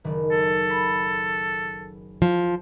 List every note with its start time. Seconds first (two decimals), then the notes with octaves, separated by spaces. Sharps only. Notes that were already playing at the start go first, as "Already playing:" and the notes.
0.04 F#1 D#3 B4
0.31 A4
0.70 B5
2.22 F3